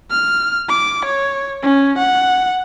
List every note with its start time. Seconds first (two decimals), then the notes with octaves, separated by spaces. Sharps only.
0.10 F6
0.69 D6
1.06 C#5
1.63 C#4
1.99 F#5